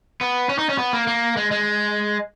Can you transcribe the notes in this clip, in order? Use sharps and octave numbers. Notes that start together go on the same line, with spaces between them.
B3
C#4
D#4
C#4
B3
A#3
A#3
G#3
G#3